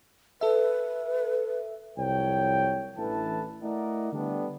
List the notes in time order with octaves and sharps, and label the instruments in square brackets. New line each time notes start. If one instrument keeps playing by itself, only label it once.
[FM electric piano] A4 E5 [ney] B4
[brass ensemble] C2 F2 F#3 C#5 G5
A1 E3 D4 A4 B4 A5
A3 E4 A#4 D5 D#5 F#5
D3 G3 A3 B3 D4